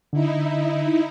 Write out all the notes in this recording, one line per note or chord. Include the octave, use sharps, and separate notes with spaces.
D3 D#4 E4